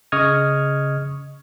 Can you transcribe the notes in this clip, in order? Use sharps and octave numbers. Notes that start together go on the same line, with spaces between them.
C#3 D#5 C#6 D#6 F6 G#6